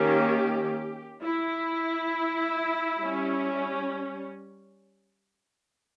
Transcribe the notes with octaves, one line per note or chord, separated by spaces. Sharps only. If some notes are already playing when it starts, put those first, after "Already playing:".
Already playing: D#3 A#3 C#4 G4
E4
G3 C#4